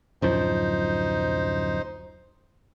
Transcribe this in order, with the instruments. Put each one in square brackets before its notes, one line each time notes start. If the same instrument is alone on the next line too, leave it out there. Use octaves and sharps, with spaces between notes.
[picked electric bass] D1 F#2 F3 [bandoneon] D#4 C5